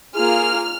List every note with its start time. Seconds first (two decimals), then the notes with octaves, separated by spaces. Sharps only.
0.15 A#3 F4 G#4 F6